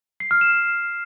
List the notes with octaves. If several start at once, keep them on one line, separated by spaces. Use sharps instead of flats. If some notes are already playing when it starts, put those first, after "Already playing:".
C7
F6
E7